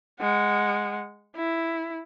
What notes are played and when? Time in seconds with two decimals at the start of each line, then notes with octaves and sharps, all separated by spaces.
0.20 G#3 F#5
1.36 E4